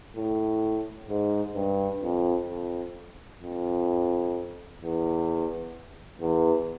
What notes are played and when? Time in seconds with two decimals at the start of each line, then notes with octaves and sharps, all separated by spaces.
0.16 A2
1.09 G#2
1.55 G2
2.02 F2
2.48 F2
3.42 F2
4.82 E2
6.21 E2